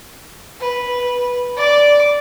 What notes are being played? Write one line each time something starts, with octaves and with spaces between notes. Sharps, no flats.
B4
D5 D6